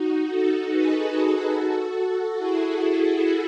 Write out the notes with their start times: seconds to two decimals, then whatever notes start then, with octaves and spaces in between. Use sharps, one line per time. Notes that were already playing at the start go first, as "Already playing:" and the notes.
Already playing: D#4 F#4
0.28 F#4 A4
0.70 G#4 B4
1.53 F#4 A4
2.37 E4 G#4